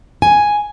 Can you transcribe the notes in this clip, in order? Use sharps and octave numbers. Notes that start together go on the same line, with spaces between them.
G#5